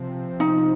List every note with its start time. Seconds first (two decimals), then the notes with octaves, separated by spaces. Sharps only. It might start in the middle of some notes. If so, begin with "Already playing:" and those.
Already playing: C3 F3 C4
0.40 D#4